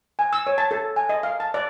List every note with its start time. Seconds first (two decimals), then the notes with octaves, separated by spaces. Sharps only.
0.19 G#5
0.33 E6
0.47 C#5
0.58 A5
0.71 A4
0.96 G#5
1.09 D#5
1.23 F5
1.40 A5
1.54 D5